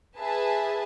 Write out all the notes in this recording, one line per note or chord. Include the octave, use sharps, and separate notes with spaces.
G#4 B4 E5 A5